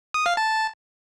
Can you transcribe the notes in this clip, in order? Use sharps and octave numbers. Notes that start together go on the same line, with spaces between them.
D#6
F5
A5